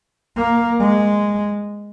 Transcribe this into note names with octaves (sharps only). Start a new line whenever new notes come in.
A#3
G#3